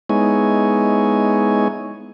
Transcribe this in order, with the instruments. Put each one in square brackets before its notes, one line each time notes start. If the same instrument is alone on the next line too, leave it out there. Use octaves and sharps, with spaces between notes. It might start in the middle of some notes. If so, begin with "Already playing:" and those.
[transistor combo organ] G#3 B3 D#4 E4 C#5 G#5